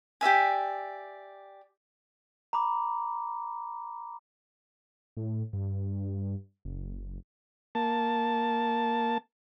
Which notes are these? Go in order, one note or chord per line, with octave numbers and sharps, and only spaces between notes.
G4 D5 E5 G#5
A#5 B5 D6
A2
G2
F#1
A#3 A5